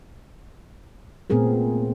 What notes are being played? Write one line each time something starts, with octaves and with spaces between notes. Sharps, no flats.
A#2 A3 B3 C4 G#4 A#4